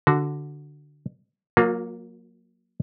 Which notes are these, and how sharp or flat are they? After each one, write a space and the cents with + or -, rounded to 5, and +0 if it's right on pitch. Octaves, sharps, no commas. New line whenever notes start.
D3 +0 F#4 +0
F#3 -15 A#3 +0 F4 +40